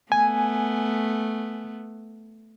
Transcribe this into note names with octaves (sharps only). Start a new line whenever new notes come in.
A3 B3 G#5